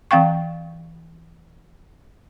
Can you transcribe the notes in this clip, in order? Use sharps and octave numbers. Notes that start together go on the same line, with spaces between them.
E3 C4 F5 G5 C#6